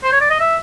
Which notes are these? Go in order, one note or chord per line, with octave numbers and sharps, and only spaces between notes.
C5
C#5
D5
D#5
E5